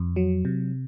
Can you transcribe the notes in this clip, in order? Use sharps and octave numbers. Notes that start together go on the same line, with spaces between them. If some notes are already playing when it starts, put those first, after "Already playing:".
Already playing: F2
F#3
C3